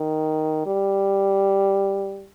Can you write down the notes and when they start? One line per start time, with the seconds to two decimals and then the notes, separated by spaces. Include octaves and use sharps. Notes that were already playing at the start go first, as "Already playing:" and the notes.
Already playing: D#3
0.66 G3